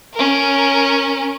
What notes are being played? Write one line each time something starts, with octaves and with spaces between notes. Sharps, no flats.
C#4 A#4